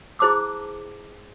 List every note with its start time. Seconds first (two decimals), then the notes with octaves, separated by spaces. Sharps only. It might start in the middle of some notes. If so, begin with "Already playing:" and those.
0.19 E4 G#4 C5 A5 D6 E6